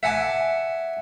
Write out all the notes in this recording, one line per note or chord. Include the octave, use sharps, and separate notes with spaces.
E5 F#5 G#5 A5 D6